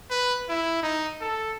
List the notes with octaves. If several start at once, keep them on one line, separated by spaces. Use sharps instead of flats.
B4
E4
D#4
A4